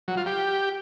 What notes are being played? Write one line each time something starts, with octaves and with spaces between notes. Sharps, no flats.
F#3
F4
G4